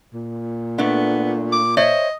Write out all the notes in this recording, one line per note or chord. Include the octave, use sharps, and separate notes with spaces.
A#2
A3 B3 D4
D6
C5 C#5 D#5 E5